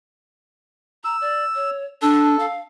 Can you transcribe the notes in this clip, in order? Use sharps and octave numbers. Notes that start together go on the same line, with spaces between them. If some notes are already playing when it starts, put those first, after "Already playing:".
A#5 E6
D5
C#5
D4 A4
F5